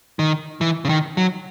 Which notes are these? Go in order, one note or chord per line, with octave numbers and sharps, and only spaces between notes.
D#3
E3
C#3
D#3
F#3